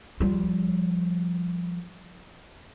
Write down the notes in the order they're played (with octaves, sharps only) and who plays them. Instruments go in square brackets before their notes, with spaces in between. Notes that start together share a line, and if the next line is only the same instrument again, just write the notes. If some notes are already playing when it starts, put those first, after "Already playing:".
[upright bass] F3 G3